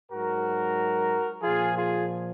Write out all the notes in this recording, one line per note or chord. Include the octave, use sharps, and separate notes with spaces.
G#2 F#3 F#4 A#4
A#2 F3 F4 G#4
F4 G#4